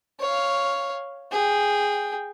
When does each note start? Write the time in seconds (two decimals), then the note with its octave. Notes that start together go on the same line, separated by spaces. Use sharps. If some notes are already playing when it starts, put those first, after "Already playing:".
0.20 C#5 F5
1.31 G#4 G5